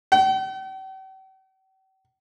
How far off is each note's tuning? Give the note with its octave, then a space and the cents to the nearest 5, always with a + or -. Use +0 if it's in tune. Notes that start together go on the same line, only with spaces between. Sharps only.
G5 -45